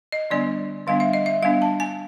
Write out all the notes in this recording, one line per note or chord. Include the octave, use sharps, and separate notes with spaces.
D#5
D3 G3 B3 D4 D5
D3 G3 B3 D4 F5
E5
D#5
E5
G3 B3 D4 F5
A5
G#5